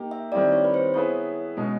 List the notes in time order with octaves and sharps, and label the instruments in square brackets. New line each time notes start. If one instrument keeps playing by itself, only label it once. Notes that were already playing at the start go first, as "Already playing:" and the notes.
Already playing: [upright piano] A#3 D#4 G4
[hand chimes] E5
[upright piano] D#3 G3 C4 E4 G4 [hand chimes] D5
[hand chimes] C#5
B4
C5
[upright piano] B3 E4 G#4 B4 E5 [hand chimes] C#5
[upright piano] B2 G#3 C#4